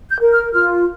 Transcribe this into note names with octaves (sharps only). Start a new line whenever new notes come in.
G6
A#4
F6
F4 F6